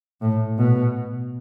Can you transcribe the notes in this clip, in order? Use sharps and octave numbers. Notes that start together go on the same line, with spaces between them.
A2
B2